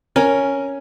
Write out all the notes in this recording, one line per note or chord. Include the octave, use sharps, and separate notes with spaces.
C#4 A#4 G#5